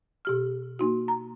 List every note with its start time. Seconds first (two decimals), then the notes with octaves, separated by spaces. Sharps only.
0.25 B2 G4 F6
0.79 A#3 D#4 F#4
1.08 A#5